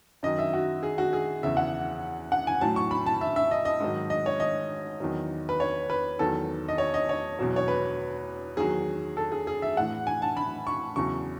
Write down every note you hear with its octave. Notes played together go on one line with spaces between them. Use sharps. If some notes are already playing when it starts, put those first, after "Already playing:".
F#2 D#3 F#3 D#5
E5
F#4
G#4
F#4
G#4
E2 C#3 E3 E5
F#5
F#5
G#5
A2 F#3 A5
C#6
B5
A5
E5
E5
D#5
D#5
G#2 D#3 F#3
D#5
C#5
D#5
E2 D#3 F#3
B4
C#5
B4
E2 D#3 F#3 A4
D#5
C#5
D#5
C#5
E2 B2 F#3
C#5
B4
E2 D#3 F#3 G#4
A4
G#4
G#4
E5
A2 E3 F#5
G#5
A5
B5
C#6
E2 C#3 F#3 C#6